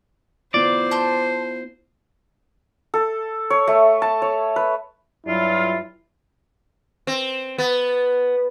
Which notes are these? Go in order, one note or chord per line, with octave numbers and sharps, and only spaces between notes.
B3 E4 F4 C5 D5
A5 C6 G6
A4
C#5
A3
A5
C#5
B4
G2 F#3 E4 F4
C4
B3